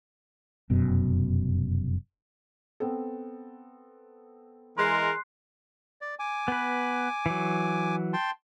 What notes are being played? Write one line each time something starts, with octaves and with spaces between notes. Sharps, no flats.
F1 F#2 B2
B3 C4 A4
E3 G#3 A#4 C6 F#6 C7
D5
G#5 D6
B3 B4
E3 F#3
G5 A5 C6